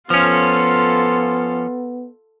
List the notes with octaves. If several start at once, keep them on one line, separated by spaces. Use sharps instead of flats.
F3 B3 C#4 F4 A4